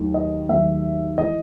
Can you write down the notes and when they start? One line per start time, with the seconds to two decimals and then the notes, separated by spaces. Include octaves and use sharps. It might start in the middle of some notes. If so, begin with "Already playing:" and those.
Already playing: D#2 D#3 F#3 A3
0.14 D#5
0.49 D#2 D#3 F#3 A3 E5
1.17 E3 G#3 D#5